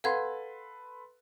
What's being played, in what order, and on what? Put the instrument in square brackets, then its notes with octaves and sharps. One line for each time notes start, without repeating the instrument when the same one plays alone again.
[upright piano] A4 B4 C6 [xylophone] F5 F#5 G#6